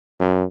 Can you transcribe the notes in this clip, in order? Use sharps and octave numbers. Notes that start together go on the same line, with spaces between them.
F#2